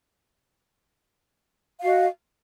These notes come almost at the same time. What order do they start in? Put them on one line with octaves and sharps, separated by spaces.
F5 F#4 D#5